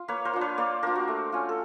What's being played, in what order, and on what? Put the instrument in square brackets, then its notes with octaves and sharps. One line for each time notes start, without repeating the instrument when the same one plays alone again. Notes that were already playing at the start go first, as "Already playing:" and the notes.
Already playing: [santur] F4
A#3 B4 C#5
A#4 C5
D4 F4
B4 C#5
A#3 C5 D5
D4 F4 A#4 C5
F#4
A3
C#4 F4
A4